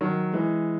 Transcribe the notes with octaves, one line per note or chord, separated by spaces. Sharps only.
D#3 F#3
E3 G#3